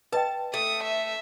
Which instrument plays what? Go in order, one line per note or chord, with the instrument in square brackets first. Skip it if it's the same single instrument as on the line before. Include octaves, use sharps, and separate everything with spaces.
[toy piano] B4 D#5 G5 [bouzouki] A5
[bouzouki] A3 [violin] D#6
[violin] E5